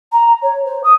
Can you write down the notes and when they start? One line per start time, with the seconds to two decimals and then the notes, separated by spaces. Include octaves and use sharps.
0.12 A#5
0.42 C#5
0.65 C5
0.83 D#6